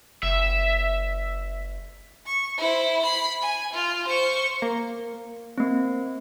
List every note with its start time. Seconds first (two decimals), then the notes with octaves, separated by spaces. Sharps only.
0.23 F#1 E5
2.26 C#6
2.57 E4 C5
3.02 B5 C7
3.42 G#5
3.74 F4
4.08 C5 C#6
4.62 A#3
5.58 A#3 C4